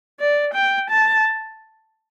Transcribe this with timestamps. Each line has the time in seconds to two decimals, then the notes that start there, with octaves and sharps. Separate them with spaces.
0.20 D5
0.54 G5
0.90 A5